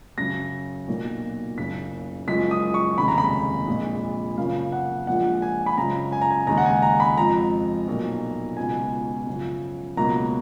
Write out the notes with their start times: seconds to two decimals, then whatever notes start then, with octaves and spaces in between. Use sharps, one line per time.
0.18 F#2 C#3 F#3 A#6
0.88 B1 A#2 F#3 A#3
1.58 F#1 F#2 C#3 B6
2.28 F#1 F#2 F3 G#3 B6
2.51 D#6
2.74 C#6
2.98 F1 D#2 C#3 G#3 B5
3.08 A#5
3.18 B5
3.68 A#1 A#2 G#3
4.37 F#2 C#3 F3 A#3 F5
4.72 F#5
5.07 A#1 A#2 F3 G#3 F#5
5.42 G#5
5.66 B5
5.78 F#2 C#3 F3 G#3 A#5
6.12 G#5
6.22 A#5
6.31 G#5
6.47 D#2 C#3 G#3 A#5
6.58 F#5
6.65 G#5
6.82 A#5
7.00 B5
7.17 F2 F3 G#3 A#5
7.87 B1 A#2 F#3 A#3
8.57 C#2 B2 G#3 G#5
9.27 F#2 C#3 F3
9.97 C#2 B2 F#3 A#3 A#5